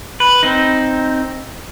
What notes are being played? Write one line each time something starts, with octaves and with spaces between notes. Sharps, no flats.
B4
C4 D#4